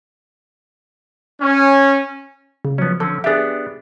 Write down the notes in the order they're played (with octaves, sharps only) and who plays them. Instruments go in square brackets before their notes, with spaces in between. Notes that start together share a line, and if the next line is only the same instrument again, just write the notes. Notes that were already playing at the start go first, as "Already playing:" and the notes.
[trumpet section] C#4
[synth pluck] C#3
[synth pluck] F3 F#3 [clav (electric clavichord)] B3 C#4
[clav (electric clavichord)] D3 C4 C#4 [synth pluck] A4
[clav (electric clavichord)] B3 D4 G4 [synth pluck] G#4 E5